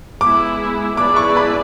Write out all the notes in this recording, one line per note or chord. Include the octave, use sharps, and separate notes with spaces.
G#3 B3 E4 G#4 D6
B3 E4 G#4 B4 D5 D6
C#6
B5